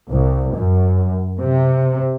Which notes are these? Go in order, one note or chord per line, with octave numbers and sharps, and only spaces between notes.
C2
F#2
C3